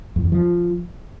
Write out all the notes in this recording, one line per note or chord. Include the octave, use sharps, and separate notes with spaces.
F2
E2
F3